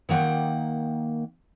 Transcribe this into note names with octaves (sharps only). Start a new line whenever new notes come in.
D#3 A#3 F#5 G5